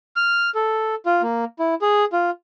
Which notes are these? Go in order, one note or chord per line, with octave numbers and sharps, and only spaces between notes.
F6
A4
F4
A#3
E4
G#4
F4